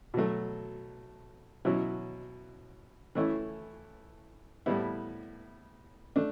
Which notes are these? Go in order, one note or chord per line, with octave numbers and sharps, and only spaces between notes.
B2 F#3 A3
B2 F#3 C#4 E4
E3 A3 C#4 E4
A2 G3 B3 E4
A3 D4